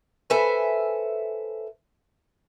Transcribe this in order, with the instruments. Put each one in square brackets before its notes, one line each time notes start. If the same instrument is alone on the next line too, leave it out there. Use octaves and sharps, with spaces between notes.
[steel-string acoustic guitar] A4 B4 C5 E5 G#5